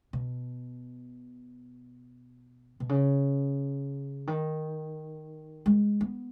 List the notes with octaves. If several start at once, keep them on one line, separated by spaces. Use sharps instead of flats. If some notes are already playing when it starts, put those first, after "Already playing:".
B2
B2
C#3
D#3
G#3
B3